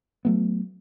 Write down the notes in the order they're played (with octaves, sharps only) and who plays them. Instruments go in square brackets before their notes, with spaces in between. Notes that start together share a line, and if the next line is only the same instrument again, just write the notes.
[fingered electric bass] F#3 A3 B3